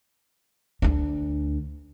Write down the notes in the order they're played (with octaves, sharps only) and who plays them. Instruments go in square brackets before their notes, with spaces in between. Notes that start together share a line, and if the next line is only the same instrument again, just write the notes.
[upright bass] D2 D4